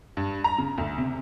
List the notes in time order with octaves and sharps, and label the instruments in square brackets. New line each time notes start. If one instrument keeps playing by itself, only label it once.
[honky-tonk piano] G2
A#5
C#3
D2
C3